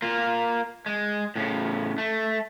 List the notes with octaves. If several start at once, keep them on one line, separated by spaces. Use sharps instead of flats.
A#3 F4
G#3
A2 C#3
A3